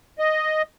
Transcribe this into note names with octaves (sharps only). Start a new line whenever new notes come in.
D#5